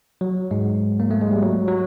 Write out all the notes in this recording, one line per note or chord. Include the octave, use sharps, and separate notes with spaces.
F#3
G#2 G#3
A#3
A3
G#3
G3
F#3
F#3